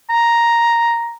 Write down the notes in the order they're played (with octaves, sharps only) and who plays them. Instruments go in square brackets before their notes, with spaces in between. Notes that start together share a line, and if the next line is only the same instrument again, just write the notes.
[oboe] A#5